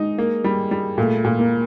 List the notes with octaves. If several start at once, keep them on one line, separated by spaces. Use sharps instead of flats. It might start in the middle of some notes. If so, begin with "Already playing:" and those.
Already playing: G#3 D#4
A#3
G3
G3
A#2 A3
A#2
A#3